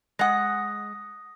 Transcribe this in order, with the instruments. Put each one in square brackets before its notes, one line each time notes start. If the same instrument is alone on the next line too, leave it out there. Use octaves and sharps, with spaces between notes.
[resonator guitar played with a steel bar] G#3 F#5 [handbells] D#6 A#6